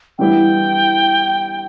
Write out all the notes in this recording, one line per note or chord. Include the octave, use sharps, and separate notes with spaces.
G2 E3 G3 B3 E4 G5